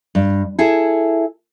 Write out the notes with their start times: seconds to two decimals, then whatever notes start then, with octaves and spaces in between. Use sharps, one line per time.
0.15 G2
0.59 E4 G#4 A4